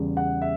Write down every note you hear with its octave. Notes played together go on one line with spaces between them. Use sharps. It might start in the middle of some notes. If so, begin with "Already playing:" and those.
Already playing: E2 C#3 G3
F#5
E5